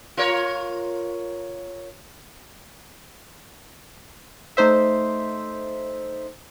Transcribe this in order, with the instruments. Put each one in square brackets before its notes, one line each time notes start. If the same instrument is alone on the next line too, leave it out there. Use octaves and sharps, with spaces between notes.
[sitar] F4 A#4 C#5
[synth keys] A3 D#4 C5 E5